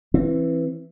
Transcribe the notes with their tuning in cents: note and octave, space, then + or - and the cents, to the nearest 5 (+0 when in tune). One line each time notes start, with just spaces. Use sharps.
E3 +5 C4 +30